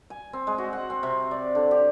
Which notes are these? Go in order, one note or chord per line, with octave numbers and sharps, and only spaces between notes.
G#5
C4
G#3
F#4
F#5
C4
C3
D5
D3
G4